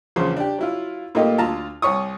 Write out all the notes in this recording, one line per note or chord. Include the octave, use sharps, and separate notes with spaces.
A#1 E2 C#3 F3 C5
D4 G4
F#3 E4 F4
A#2 A3 A#3 D#4 G4
D2 F4 A5 A#5
C2 C#5 C#6 D#6